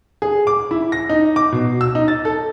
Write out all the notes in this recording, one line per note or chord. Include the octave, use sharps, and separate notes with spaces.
G#4
D6
E4
A#6
D#4
D6
B2
E6
D#4
A6
A4